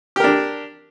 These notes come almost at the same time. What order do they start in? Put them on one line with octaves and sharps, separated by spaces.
G4 A#4 D4